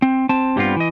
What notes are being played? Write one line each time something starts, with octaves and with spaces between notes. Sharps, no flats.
C4
C4 A5
G2 G3 A3 B3 C4 F4
E3 D#5